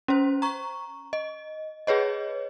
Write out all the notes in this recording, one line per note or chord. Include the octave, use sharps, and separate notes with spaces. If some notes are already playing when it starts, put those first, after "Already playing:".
C#4 C5
A#5 C#6
D#5
G#4 B4 C#5 D#5